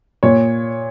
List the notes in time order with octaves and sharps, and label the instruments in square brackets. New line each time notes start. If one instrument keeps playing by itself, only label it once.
[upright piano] A#2 C#5